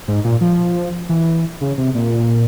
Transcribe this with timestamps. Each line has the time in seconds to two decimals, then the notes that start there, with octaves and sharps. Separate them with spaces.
0.08 G#2
0.24 A#2
0.41 F3
1.09 E3
1.61 C#3
1.78 C3
1.95 A#2